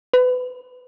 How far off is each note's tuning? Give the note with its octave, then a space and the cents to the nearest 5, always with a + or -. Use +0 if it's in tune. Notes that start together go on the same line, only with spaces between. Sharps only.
B4 +25